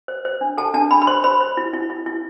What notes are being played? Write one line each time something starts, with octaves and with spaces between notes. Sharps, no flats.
C5
C5
D4
A4 A5
D4 A5
D4 B5
B5
C5 C6
C5 B5
C5
E4
E4
E4
E4